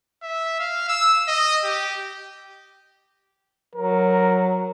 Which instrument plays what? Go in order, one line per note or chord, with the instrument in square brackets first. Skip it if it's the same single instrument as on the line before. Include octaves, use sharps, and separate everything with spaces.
[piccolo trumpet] E5
F5
E6
D#5
G4
[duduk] F#3 [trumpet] A#4